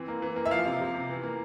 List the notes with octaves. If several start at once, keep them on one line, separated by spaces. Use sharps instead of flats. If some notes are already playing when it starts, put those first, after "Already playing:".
Already playing: E3 C4
A#3
E3
A#3
E5
F3 F5
C3
C3
C3
E3
A#3